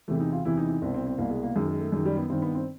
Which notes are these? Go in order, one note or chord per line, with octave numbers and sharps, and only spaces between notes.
E2 C3 E3 A3
D#4
F4
E2 C3 E3 E4
D#4
D#4
C2 B2 C4
C4
C4
C2 B2 A#3
G#3
A#3
F#2 D#3 G#3
G#3
A3
F#2 D#3 G#3
G3
B3
G2 D#3 C4
B3
C4